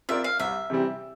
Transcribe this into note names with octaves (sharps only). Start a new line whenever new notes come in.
C4 F4 A#4 D5 E5
F5
C2 E5
C3 E3 G3 C4